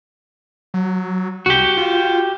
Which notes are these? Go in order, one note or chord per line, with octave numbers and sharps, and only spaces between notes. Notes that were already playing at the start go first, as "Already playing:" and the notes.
F#3
C2 F#4 G4
F4